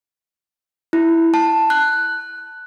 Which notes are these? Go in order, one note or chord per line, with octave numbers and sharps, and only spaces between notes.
E4
A5
F#6